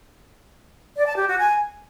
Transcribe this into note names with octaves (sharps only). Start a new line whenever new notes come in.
D5
A5
G4
F#4
G#5